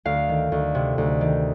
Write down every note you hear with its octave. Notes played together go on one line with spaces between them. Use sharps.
D2 F5
D#3
D2
C3
D2
D#3